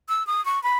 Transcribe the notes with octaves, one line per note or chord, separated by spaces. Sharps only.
E6
D#6
C#6
B5